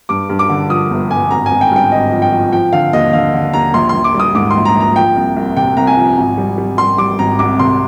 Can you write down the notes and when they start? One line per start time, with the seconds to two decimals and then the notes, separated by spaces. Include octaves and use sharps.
0.09 G2 D6
0.29 G2
0.39 D6
0.49 D3
0.70 F3 D#6
0.91 G1
1.11 G1 G#5
1.31 G#1 A#5
1.46 G#5
1.51 G#1
1.61 G5
1.71 G2 G5
1.92 G#1 D#5
2.12 F3
2.22 G5
2.32 F3
2.52 F3 G5
2.73 D3 F5
2.93 D#2 D#5
3.13 D3 F5
3.33 D3
3.53 D#2 A#5
3.74 A#1 C6
3.89 A#1 C6
4.04 D6
4.14 G3
4.20 D#6
4.35 G#2 D6
4.51 A#1 C6
4.65 A#5
4.76 A#1 A#5
4.96 F3 G5
5.16 C2
5.36 C2
5.57 C3 G5
5.77 C2 A#5
5.87 G#5
5.97 F3
6.17 G#1
6.38 G3
6.58 G3
6.78 G3 C6
6.98 G3 D6
7.19 G#1 A#5
7.39 C2 D6
7.60 C3 C6